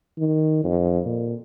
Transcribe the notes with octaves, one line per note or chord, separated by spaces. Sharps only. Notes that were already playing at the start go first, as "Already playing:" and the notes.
D#3
F2
A#2